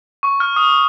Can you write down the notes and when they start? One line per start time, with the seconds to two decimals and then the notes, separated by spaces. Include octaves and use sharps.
0.23 C#6
0.40 F6
0.56 D#6